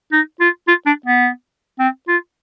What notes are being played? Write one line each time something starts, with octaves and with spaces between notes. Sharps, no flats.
D#4
F4
F4
D4
B3
C4
F4